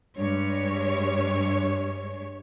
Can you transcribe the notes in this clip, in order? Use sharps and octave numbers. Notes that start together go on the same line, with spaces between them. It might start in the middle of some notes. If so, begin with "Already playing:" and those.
G2 G#3 C#5